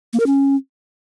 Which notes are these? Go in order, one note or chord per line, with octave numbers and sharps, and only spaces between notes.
A#3
A#4
C#4